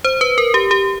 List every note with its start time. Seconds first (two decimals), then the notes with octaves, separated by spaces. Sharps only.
0.05 C5
0.21 B4
0.38 A#4
0.54 G4
0.71 G4